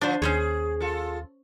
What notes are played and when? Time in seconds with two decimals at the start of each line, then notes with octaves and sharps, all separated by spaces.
0.01 D3 F3 D4 C5
0.22 D#2 C#4 G#4 C5 C#5
0.80 F4 A4